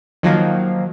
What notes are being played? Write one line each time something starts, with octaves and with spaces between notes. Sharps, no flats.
D#3 F3 F#3 A#3